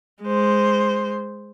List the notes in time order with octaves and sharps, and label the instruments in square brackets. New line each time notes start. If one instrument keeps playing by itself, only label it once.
[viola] G#3 C5